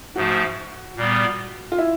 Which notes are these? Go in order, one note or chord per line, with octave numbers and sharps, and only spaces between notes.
G#2 F3 A3 F#4
A#2 G3 B3
F4
E4